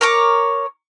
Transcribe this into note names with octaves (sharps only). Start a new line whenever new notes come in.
A#4 C#5 D6